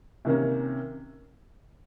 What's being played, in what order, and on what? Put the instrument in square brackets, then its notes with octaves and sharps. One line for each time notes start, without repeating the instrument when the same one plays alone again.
[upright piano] C3 D#3 A#3 C#4